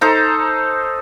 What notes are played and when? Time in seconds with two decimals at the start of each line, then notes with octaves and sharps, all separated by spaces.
0.01 D#4 A4 C5 A#5